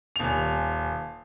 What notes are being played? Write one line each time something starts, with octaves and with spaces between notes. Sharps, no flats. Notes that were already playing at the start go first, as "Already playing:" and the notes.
D#1 F7